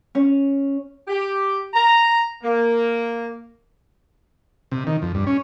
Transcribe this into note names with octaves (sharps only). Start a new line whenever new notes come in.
C#4
G4
A#5
A#3
C3
D#3
F2
G2
C#4